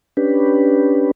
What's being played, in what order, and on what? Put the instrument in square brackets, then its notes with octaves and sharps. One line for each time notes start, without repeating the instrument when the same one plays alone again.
[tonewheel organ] C#4 D4 G4 B4